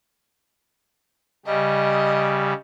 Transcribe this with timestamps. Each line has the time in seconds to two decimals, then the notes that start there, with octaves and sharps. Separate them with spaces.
1.46 C#3 G3 D#5